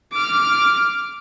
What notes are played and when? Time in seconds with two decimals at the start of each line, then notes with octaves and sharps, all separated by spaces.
0.13 D6 F6